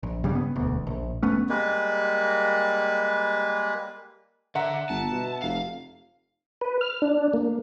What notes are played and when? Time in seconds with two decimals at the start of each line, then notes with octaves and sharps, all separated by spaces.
0.03 A#1
0.24 G2 C#3 G3
0.35 B3
0.55 E1 D2
0.87 A#1
1.23 F1 A3 B3 C#4
1.49 G3 G#3 A#3 B4
4.55 D3 E5 F#5 A#5
4.89 G1 A5
5.11 B2
5.42 F1 F5
6.61 B4
6.81 F6
7.02 D4
7.33 A#3